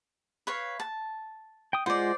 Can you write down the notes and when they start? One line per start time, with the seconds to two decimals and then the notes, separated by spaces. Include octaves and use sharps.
0.47 B4 C#5 F5
0.80 A5
1.73 G5 D#6
1.86 G#3 F4 C5 D5 F#5